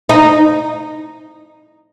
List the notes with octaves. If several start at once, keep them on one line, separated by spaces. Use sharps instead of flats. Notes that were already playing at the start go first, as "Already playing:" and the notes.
D#4